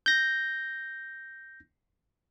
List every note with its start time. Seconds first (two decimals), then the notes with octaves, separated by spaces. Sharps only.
0.06 G6 A#6